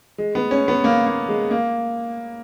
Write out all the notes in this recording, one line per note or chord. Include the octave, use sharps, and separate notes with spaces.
G#3
B3
C#4
B3
A#3
A#3
G#3
A#3